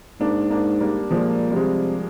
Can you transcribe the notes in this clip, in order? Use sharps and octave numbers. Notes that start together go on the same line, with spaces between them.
G#2 A#3 D4
A#3 D4
G3 A#3
A#2 F3 G#3
G3
C3 F3 G#3